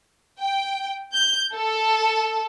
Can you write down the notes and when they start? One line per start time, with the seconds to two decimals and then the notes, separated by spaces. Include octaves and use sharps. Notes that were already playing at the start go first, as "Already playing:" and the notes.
0.39 G5
1.13 G6
1.54 A4